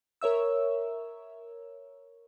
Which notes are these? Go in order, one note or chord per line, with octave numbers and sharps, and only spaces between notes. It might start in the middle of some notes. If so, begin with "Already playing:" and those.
A#4 C#5 E5 E6